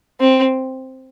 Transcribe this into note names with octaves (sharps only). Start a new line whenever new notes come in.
C4